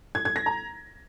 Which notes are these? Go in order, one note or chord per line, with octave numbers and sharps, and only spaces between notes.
G#6
G#6
A#6
A#5